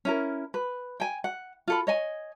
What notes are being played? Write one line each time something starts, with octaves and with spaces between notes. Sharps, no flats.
C#4 E4 A#4
B4
G5 G#5
F#5
F4 A4 B5
C#5 D#5 G#5